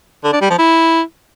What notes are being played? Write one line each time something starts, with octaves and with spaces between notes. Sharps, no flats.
D3
D4
G3
F3
E4